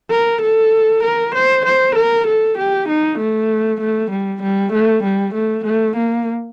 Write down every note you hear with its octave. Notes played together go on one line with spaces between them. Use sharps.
A#4
A4
A#4
C5
C5
A#4
A4
G4
D#4
A3
A3
G3
G3
A3
G3
A3
A3
A#3